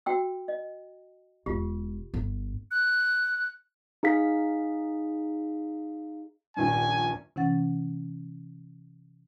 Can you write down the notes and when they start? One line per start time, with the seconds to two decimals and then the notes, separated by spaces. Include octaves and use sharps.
0.06 F#4 G5 E6
0.48 D#5
1.46 E1 F4 G4
2.14 G1
2.71 F#6
4.03 D#4 G#4 F5 B6
6.57 D#1 A#1 G2 G#5
7.36 C3 E3 C#4 F#5 A6